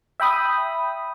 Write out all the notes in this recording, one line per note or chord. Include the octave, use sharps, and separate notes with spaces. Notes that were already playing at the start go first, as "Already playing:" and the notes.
E5 G5 B5 D#6